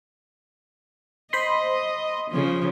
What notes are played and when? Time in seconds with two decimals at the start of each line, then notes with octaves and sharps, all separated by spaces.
1.33 C5 D#5 B5 C6
2.30 C#3 F3